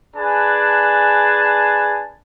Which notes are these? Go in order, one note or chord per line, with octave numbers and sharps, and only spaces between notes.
D4 G#4 B4 G#5 A5